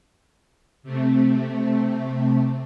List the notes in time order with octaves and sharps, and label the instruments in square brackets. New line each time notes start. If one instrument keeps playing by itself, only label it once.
[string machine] C3 A3